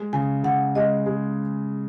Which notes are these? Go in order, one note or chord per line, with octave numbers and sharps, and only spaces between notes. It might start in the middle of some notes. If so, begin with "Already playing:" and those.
Already playing: G#3
C#3 G#5
C#3 F#5
G#3 D#5
G#3